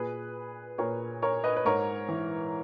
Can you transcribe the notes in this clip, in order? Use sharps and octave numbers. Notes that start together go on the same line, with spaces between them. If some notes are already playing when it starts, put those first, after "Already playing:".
Already playing: A#2 G#4 B4
A#2 A#4 C#5
A#4 C#5
B4 D#5
B4
G#2 A#4 C#5
E3